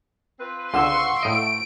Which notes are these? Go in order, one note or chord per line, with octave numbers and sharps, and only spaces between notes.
C4 F4 B4
C#2 D3 F5 F#5 C6 C#6 E6
A2 A3 D#5 D7